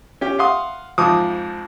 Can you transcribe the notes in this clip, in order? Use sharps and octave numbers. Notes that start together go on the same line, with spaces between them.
C#4 G4
F5 F#5 C6 D#6
F2 G#2 F3 D6 D#6